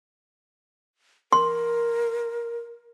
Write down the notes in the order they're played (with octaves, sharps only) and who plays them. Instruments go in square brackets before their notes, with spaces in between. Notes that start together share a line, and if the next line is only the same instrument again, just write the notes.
[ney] A#4 [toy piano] C6